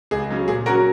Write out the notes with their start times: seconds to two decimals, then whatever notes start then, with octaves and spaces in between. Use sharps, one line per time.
0.11 C#2 G#4
0.30 C#3 F#3 C#4
0.48 A#2 G#4
0.66 C#4 F#4 A#4
0.70 F#3